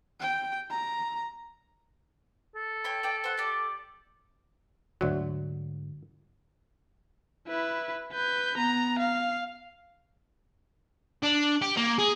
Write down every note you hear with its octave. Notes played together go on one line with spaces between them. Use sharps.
G5
A#5
A4
C#5 G5 B5
D5 G5
C5 F#5
G4 D5
D2 G#2 D3 F#3
E4 B4
B4 G6
B3 A#5
F5
D4
G4
A#3
G#4